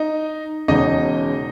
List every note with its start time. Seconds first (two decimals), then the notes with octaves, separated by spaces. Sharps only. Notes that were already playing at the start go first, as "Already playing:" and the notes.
Already playing: D#4 D#5
0.68 E1 E2 C#3 D#4 D#5